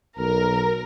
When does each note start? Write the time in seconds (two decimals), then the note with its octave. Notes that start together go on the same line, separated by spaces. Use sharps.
0.19 B1 A#4